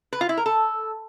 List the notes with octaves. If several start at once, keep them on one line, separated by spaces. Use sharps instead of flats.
B4
F4
E4
A#4
A4